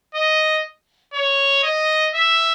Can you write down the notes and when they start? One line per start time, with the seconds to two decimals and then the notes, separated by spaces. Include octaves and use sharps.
0.15 D#5
1.14 C#5
1.63 D#5
2.14 E5